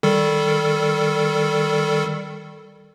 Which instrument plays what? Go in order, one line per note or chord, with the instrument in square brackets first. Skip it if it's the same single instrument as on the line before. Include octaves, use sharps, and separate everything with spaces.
[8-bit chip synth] D#3 G3 A4